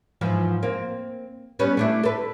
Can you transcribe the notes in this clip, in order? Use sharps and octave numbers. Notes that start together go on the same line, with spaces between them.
E2 G#2 F3
A#3 C4
G3 B3 C#4
A3 D4 E4
A4 B4